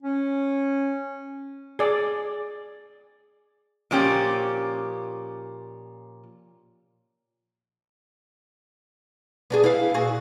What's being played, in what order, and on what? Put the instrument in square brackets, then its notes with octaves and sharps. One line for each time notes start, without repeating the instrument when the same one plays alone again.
[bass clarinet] C#4
[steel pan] G#4 D5
[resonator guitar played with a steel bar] A#2 F3 C#4 G4
[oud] B3 D4 G#4
E4 B4 F5
A#2 F#4 G#4